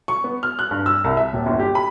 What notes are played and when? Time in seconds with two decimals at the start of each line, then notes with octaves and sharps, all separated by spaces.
0.08 C#6
0.24 B3
0.43 F6
0.59 F#6
0.71 G2
0.86 E6
1.04 C2
1.17 E5
1.33 D#1
1.46 G1
1.60 G4
1.75 B5